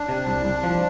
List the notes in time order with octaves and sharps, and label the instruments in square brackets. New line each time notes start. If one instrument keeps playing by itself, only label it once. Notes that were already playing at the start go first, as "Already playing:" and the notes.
Already playing: [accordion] D4
[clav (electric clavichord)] C3
C2
C2
F3